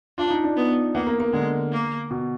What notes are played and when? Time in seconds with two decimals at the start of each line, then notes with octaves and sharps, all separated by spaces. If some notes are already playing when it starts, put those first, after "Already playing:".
0.18 D4 F4
0.30 D#4
0.44 D4
0.56 B3
0.94 A#3 B3
1.07 A#3
1.20 A#3
1.32 D3 G#3
1.72 A#3
2.11 B2